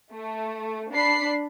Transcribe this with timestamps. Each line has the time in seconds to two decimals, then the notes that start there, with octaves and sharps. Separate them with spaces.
0.11 A3
0.93 D4 B5 C7